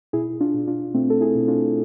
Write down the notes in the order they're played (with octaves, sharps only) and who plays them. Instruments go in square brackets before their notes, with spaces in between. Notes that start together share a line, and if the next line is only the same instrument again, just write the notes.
[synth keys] B2 E4 G#4
D4 F4
B2
D4 F4
B2 A3 C4
A4
E4 G#4
B2
D4 F4